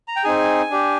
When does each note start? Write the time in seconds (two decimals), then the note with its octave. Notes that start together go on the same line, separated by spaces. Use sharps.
0.08 A#5
0.16 G5
0.24 C4 D#4 G#4 G#5
0.70 D4 G4